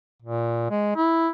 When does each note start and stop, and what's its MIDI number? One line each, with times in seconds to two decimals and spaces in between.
0.22 0.67 46
0.70 0.94 56
0.96 1.29 64